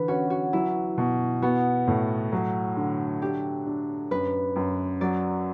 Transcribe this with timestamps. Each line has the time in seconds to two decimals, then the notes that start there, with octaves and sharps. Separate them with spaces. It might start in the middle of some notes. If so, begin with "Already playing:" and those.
Already playing: D3 E3 B4
0.08 C#4 F#4
0.30 F#4
0.53 F#3 E4
0.98 B2
1.42 B3 F#4
1.87 A2
2.32 F#3
2.76 D3
3.21 D4 G4
3.66 D4
4.11 F#2 B4
4.56 F#2
5.01 F#3 D5